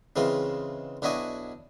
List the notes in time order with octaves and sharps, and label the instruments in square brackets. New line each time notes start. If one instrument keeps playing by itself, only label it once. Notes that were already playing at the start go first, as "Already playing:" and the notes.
[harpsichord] C#3 E3 G#3 C4 F4
B1 D4 E4 F#4 D#5 G#5